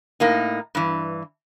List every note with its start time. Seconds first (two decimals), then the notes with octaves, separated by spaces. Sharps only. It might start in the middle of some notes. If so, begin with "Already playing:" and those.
0.20 A2 A#3 D#4
0.75 G2 E3